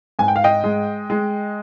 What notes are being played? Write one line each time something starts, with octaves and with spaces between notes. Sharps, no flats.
G#2 G#5
G5
F5
D#5 G5
G#3
G#3